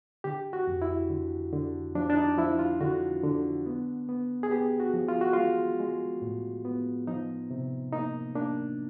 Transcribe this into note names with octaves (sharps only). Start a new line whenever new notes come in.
D3 G4
F#4
F2
E4
D3
D3
F3 D4
D4
D#4
F3 E4
F4
D3 F#4
D3
B3
B3
G#4
B3 G4
F#4
F3
F4
F#4
G#3 F4
G#3
A2
B3
F3 D#4
C3
A#3 D#4
A#3 D4